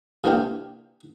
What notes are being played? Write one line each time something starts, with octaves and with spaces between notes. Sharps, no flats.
C3 E3 A#3 D4 F4 G4